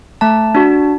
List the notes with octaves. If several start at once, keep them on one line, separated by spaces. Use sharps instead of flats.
A3 A5
D4 F#4